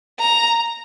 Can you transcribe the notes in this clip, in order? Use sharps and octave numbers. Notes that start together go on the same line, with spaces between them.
A#5